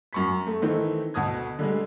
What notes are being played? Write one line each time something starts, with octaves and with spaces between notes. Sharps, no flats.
F#2 C#6 B6
A3
D#3 E3 A3 C4 D#4 E4
D2 B2 A5 D#6 G#6
D3 G3 G#3